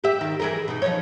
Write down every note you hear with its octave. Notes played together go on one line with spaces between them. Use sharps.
G4 E5
D#3
E3 G#4 A#4
B2 D#4
F3 D#4 C#5